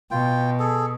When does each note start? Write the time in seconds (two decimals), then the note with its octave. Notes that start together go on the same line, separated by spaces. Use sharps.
0.11 B2 F4 G5
0.59 G#4 A4